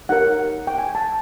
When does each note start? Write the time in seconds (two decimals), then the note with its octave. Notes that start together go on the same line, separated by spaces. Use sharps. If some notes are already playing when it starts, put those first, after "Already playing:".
0.09 D#4 G4 A#4 C#5 F#5
0.67 G5
0.78 G#5
0.95 A5